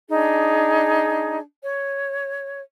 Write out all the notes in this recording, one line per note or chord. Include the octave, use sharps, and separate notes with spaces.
D4 D#4 G#4
C#5